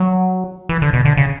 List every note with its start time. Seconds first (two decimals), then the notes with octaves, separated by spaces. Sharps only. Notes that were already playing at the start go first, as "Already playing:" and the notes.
Already playing: F#3
0.69 E3
0.82 D3
0.93 B2
1.05 D3
1.17 C#3